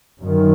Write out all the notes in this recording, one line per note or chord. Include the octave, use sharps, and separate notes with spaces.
F#2 D#3